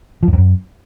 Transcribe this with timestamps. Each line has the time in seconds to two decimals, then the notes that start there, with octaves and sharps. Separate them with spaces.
0.23 F3
0.28 F#2
0.33 F2
0.38 F#2